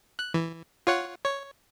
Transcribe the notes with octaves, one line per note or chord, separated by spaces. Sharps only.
F#6
E3
F4 C#5 F#5
C#5